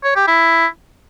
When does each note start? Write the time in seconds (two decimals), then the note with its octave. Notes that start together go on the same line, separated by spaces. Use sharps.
0.04 C#5
0.16 G4
0.27 E4